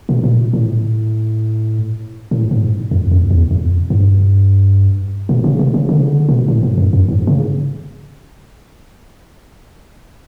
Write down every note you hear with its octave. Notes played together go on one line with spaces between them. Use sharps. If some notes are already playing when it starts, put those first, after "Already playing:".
B2
A#2
A2
A2
G#2
F2
F2
E2
F2
G2
B2
C#3
C3
C#3
D3
C#3
D3
B2
A2
G#2
F#2
F#2
G#2
C#3